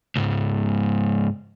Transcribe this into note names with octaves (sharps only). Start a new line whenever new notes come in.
C#2 G#2